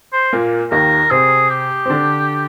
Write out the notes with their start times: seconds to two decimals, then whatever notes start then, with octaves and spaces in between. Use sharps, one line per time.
0.13 C5
0.33 A#2 A#3
0.71 D#2 D#3 A#4
1.11 C3 C4 G#4
1.50 G4
1.86 C4
1.90 D3 D4